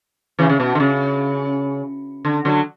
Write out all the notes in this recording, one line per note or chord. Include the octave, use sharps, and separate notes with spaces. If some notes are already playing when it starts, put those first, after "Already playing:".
C#3 E3
C#3
B2
D3
C#3
D3
D3 F#3